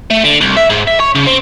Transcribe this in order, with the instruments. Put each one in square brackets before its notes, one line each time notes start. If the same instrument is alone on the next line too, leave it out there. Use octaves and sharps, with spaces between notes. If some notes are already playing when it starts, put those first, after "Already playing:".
[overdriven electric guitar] A3
D3
C2
E5
G#2
E5
C#5
C#3
C4